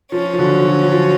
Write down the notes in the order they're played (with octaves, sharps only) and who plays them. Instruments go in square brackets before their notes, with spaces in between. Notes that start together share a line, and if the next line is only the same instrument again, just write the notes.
[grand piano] F3 [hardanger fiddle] C#4
[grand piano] F3
D3 F#3
D3 F#3
F#3
F3